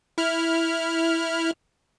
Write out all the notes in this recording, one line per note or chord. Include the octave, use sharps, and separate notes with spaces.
E4 F6